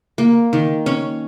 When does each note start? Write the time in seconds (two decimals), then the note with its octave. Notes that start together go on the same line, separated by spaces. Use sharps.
0.18 A#3
0.53 D#3
0.86 C#4